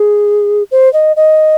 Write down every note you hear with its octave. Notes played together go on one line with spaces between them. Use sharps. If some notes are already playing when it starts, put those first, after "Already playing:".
Already playing: G#4
C5
D#5
D#5